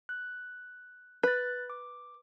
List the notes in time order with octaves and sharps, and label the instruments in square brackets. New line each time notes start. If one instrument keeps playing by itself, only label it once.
[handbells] F#6
[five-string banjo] B4 [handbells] F#6 A6
[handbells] D6